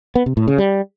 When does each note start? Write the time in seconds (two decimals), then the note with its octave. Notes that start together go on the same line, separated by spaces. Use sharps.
0.15 B3
0.26 C3
0.37 A2
0.48 C#3
0.58 G3